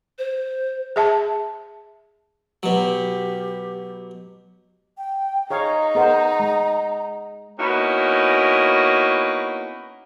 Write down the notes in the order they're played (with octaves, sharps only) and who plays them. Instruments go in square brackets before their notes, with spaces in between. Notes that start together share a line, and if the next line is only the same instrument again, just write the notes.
[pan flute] C5
[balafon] G#4 E5 A5
[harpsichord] B2 F#3 [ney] G4
[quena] G5
[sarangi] D#4 [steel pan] G#4 C#5 F5 [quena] A#5
[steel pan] B3 A#4 C5 [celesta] G#4 D#5 F#5
[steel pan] G#3
[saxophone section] A#3 B3 C#4 D#4 E4 F#4